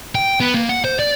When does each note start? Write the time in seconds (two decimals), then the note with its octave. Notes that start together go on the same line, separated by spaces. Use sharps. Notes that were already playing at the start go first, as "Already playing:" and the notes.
0.15 G5
0.40 B3
0.54 A#3
0.69 F#5
0.85 C5
1.00 D5